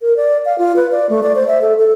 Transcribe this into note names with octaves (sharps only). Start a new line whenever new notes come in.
A#4
D5
F5
F4
B4
D5
A3
D5
C5
E5
A4
A4